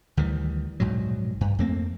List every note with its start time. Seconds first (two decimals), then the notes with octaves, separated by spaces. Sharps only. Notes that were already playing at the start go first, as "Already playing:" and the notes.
0.17 D2 D#3 E3 G3
0.80 A#1 G#2 B2 F#3
1.41 G2
1.59 F2 A3 A#3 C4